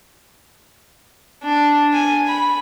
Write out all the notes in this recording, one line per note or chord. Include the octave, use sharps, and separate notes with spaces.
D4
G#5
B5